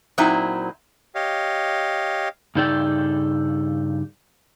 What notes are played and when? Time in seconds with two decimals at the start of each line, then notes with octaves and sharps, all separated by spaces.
0.18 A#2 F#3 C4 D#4 E4
1.15 G4 C#5 D#5 F5
2.55 G2 C#3 D#4 A4 D5 G5